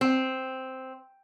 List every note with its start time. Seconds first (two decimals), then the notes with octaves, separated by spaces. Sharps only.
0.01 C4